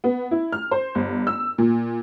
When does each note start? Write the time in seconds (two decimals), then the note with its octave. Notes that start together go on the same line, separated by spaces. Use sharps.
0.04 B3
0.31 E4
0.52 F6
0.71 C5
0.95 G1
1.27 E6
1.58 A#2